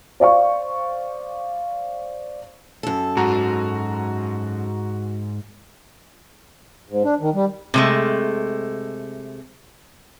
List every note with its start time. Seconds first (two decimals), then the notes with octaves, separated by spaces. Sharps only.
0.20 C5 D5 F5 C#6
2.83 F#2 A4
3.17 G#2 F#4 A#5
6.89 G#2
7.04 D4
7.21 D#3
7.35 G3
7.74 C3 G#3 A3